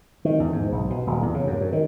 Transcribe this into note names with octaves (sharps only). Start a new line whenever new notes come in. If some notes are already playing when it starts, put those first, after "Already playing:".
D#3
E2
G#2
B1
B2
D#1
E2
C#3
F#2
F#2
D#3